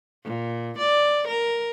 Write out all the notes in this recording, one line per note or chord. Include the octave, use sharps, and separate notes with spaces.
A#2
D5
A#4